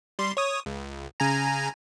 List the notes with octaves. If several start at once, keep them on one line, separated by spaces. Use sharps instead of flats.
G3 C6
C#5 D#6
C#2
C#3 G#5 A#5